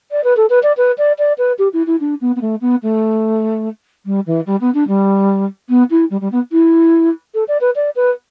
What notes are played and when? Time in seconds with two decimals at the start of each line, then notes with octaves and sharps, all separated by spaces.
0.11 D5
0.24 B4
0.36 A4
0.49 B4
0.63 D5
0.77 B4
0.98 D5
1.18 D5
1.38 B4
1.58 G4
1.73 E4
1.86 E4
2.00 D4
2.21 B3
2.36 B3
2.41 A3
2.61 B3
2.83 A3
4.05 G3
4.26 E3
4.46 G3
4.61 B3
4.74 D4
4.88 G3
5.69 B3
5.90 E4
6.10 G3
6.21 G3
6.32 B3
6.52 E4
7.34 A4
7.48 D5
7.61 B4
7.75 D5
7.96 B4